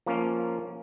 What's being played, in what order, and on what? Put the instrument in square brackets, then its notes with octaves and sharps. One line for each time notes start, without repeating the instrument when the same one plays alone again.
[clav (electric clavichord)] F3 A#3 C#4